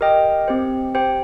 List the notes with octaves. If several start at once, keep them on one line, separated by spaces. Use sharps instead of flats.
G4 A#4 D#5 G5
C4 G4 C5
G4 C5 G5